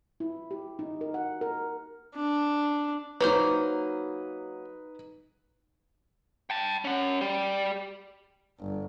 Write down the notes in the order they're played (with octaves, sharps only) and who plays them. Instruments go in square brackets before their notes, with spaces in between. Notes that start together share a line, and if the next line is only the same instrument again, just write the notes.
[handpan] E4
G4
D#4
A#4
F#5
A#4
[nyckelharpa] D4
[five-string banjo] F#3 A#3 C5 [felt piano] D#4 B4
[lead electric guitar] G5 A5
C#4 F#5
G3 G4
[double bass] G1